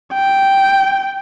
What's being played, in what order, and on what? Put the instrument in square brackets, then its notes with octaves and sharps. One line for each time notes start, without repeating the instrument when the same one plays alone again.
[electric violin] G5